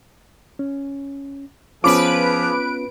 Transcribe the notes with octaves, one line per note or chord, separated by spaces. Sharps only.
C#4
F3 B3 C#4 F4 G#4 B4 D6 D7